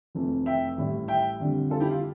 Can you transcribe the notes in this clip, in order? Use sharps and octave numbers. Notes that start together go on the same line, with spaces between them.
F1 F2 E3 A3
E5 G5
A1 A2 G3
E5 G5
F2 D3 G3
F4 A4
E4 G4
F4